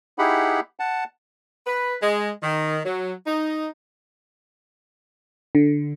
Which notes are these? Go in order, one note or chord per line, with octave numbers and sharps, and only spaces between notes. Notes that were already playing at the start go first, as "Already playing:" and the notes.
D#4 E4 G4 G#4 F#5 B5
F#5 A5
B4
G#3
D#3
F#3
D#4
D3